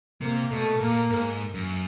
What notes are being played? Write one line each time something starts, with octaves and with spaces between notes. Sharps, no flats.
C3 A#3
B2 A3
A#2 A#3
G#2
F#2